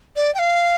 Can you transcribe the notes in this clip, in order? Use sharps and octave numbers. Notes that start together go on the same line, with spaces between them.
D5
G5
F5